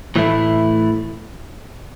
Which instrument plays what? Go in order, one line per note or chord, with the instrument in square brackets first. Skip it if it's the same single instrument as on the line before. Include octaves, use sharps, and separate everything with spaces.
[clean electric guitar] A2 E3 A3 E4